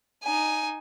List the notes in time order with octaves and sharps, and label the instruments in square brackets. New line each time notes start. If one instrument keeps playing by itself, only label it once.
[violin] D#4 G#5